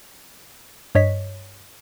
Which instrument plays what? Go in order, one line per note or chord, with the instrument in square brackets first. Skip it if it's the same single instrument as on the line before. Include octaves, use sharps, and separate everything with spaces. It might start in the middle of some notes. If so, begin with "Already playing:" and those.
[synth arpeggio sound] G2 C#5 D#5 B6